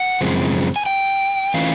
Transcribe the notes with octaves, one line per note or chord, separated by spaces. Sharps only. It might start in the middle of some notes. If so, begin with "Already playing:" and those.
Already playing: F#5
F#2 C#3 F3 G#3 C4
G#5
G5
E3 A3 C#4 F4 F5